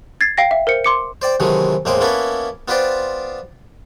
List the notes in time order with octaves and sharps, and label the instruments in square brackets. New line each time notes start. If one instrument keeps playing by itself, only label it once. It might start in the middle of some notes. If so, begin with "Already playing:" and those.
[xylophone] G#6 A6 C7
F5 G5 A#6
E5
A#4 C5 C#7
C6 D6 C#7
[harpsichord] C5 D5 G5
C3 D#3 E3 F#3 G#3 A3
E2 A2 G#3 A#3 C5 G5
A#3 B3 C#4 E4 A4 B4
B3 F4 B4 C5 D5 G5